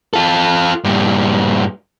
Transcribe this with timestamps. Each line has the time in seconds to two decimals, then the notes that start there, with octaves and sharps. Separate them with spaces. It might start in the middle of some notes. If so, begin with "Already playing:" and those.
0.13 F4 A4
0.84 G2 A#2